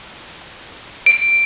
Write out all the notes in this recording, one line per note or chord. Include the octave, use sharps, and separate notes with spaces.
D7